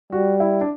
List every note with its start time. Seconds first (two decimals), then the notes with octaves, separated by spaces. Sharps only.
0.12 G3 F#4
0.40 E4
0.61 D4